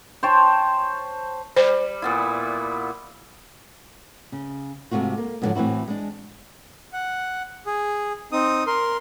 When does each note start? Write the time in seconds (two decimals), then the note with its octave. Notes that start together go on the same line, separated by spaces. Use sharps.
0.23 C5 C#5 G5 A5
1.56 G3 C5
2.02 A#2 B3 E4
4.32 C#3
4.91 G#2 C3 A3 F4 F#4
5.18 A#3
5.42 G#2 B2 D3 D#3 F3 F#3
5.55 A2 E3 C4 E4 F#4
5.88 G#3 D4
6.93 F#5
7.66 G#4
8.32 C4 D#4 D#6
8.67 A#4 C6